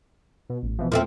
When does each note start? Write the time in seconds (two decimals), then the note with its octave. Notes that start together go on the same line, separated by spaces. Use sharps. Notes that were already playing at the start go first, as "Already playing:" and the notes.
0.49 B2
0.63 A1
0.78 B2 E3 F3
0.92 E2 F3 A3 C4